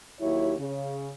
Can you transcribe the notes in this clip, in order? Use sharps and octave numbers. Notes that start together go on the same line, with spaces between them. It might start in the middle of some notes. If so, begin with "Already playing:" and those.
D#2 F#3 E4 G4 C#5
C#3